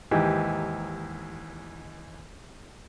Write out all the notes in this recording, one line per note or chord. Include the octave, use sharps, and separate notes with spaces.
D#2 G#2 E3 D#4 G4